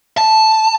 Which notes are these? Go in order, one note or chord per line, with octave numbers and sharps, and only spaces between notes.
A5